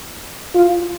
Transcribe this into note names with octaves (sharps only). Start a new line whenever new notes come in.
F4